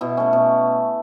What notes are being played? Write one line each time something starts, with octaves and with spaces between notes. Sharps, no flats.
B2 E4
A3 C#4
B2